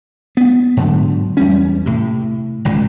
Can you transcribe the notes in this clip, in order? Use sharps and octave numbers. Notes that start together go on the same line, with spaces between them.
B3
G#2 D3 F#3
E2 G3 C#4
A2 C3
G#1 C#2 A#2